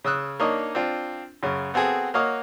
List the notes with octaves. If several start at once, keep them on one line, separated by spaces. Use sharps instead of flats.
C#3 D#6 E6 F#6
A#3 D4 D#4 C#5 D#5
C4 D4 F4
F#2 C#3
B3 C4 F#4 G#4 A4
A#3 F#4 C#5 D#5 F5